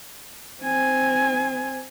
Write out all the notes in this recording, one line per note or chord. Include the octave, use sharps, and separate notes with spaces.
C4 G#5